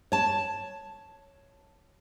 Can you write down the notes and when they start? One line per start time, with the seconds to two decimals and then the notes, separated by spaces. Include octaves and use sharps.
0.12 C#5 A5